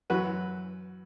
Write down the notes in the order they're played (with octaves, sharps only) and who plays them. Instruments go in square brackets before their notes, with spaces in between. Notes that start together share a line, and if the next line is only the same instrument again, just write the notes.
[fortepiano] F#2 E3 F#4 B4